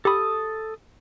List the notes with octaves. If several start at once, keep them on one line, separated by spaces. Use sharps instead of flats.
G4 A4 B5 D#6